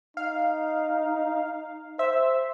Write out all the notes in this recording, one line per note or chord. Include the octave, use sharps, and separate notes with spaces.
D#4 F5
C5 E5